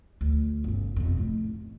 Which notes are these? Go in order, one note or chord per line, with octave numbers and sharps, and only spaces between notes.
D2
G1 C#3
F2 C3
A2
A1